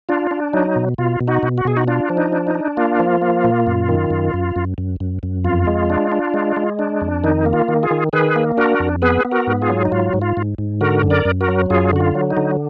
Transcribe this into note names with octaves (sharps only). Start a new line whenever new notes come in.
D4 F4
D4
F#3 D#4
B2
B2 F4
B2
D#4 F#4
B2
F#4
B2 G#4
D#4 F#4
D4 F4
F3
D#4
D4
D#4
D4
A#3 F4
F3
A#3
A#2
F#2
D#3
F#2
F#2
F#2
F#2
F#2
F#2
F2 F4
G#3
D4
D4
G#3
G#3
D4
F2
D#3 D#4
A#3
F4
D#3
F4 G#4
D#3
D#3 G#4 B4
A#3
D4 F#4 A#4
F2
B3 G#4 B4
B3
F#4 A#4
G#2
F4 G#4
F#3
D#4
G#2 F4
G#2
F4
G#2
G#2
D3 F#4 A#4
F#2
A#4 D5
F#2
F#4 A#4
F#3
F#2 F4 G#4
D3 F#4
F4
F#3
D#4
D3